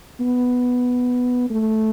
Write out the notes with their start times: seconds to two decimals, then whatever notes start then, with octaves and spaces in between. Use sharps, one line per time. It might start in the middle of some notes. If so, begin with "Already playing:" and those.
0.20 B3
1.50 A3